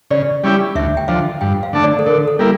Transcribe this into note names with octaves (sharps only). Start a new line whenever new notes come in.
C#3 D5
G3 C#4 E4 G4
D2 E5
G5
D3 F3 F5
G2 G5
F5
D3 A3 D4
D5
A4
D3 A#4
A4
G3 A#3 E4